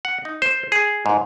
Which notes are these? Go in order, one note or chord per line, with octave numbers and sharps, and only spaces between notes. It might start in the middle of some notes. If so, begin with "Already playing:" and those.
F#5
D#4
C5
G#4
G#2